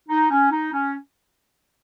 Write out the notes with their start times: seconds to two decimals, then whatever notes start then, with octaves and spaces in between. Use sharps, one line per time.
0.09 D#4
0.30 C#4
0.51 D#4
0.73 C#4